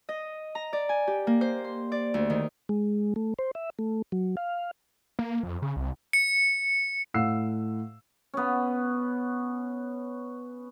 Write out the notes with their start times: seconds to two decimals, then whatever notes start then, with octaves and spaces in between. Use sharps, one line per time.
0.09 D#5
0.55 A#5
0.73 D5
0.89 G#5
1.07 G4
1.27 A#3
1.41 C5
1.64 C6
1.92 D5
2.14 D2
2.30 D#3
2.69 G#3
3.16 A3
3.39 C5
3.55 E5
3.79 A3
4.12 F#3
4.37 F5
5.19 A#3
5.43 F2
5.62 C#3
5.76 C2
6.13 C#7
7.14 A2 F5 F#5 E6 C7
8.34 B3 C#4